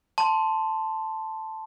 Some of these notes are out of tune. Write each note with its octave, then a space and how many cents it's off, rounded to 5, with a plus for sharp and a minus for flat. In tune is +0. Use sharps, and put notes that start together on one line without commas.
A5 +0 C6 +0